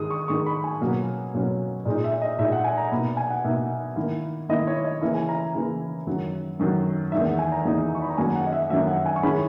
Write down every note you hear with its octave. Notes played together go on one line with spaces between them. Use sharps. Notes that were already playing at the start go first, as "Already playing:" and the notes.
Already playing: G#2 D#3 G#3 D#6
C#6
G#2 D#3 G#3 C#6
B5
G#5
B2 F#3 A#3 C#4
B2 F#3 A#3 C#4
A#2 G#3 D#4
E5
D#5
A#2 G#3 D#4 E5
F#5
G#5
A#5
B2 A#3 D#4 B5
G#5
F#5
B2 A#3 D#4 E5
D#3 A#3 E4
D#3 A#3 E4 D#5
C#5
D#5
C#3 E3 A#3 E4 E5
G#5
A#5
C#3 E3 A#3 E4
F#2 D#3 F#3
F#2 D#3 F#3
E2 D#3 A#3 D#4 E5
F#5
G#5
A#5
E2 D#3 A#3 D#4 A#5
C#6
B5
A#5
F#2 D#3 F#3 A#3 G#5
F#5
D#5
E5
F#2 D#3 F#3 A#3 E5
F#5
G#5
C#6
D#3 G#3 C#4 E4 B5